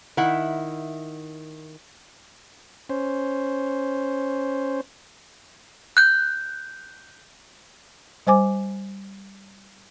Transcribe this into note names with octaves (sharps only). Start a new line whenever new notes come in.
D#3 E4 E5 F#5
C#4 C5
F#6 G6
G3 C5 G#5 D6